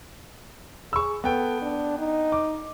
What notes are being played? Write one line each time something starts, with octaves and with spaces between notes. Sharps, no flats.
G#4 C#6 E6
B3 A4 G5
D4
D#4
D6